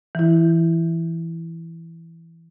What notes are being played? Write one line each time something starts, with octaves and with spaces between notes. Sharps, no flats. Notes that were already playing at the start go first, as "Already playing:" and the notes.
E3 E4